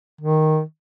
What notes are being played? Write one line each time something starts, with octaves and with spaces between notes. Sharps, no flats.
D#3